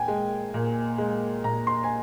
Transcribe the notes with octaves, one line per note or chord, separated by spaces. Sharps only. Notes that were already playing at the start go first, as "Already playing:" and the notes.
Already playing: A#2 G5 G#5
G#3
A#2
G#3
A#2 A#5
C6
G#5